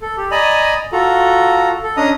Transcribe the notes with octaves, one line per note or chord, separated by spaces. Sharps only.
A4
G4
D5 D#5 G#5 A#5 B5
F4 F#4 A4 A#5
A4
C#4 D4 D#5 A#5 D#6